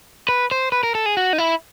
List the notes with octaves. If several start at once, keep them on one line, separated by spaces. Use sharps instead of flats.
B4
C5
B4
A#4
A4
G#4
F#4
D#4
E4